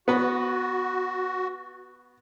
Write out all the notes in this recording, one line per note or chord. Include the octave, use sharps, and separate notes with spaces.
B3 F#4 B4